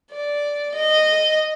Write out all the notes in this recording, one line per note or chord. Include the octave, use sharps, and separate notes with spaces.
D5
D#5